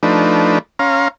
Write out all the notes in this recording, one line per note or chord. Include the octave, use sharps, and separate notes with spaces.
F3 A3 D4 D#4 B4
C#4 F5 A#5 C6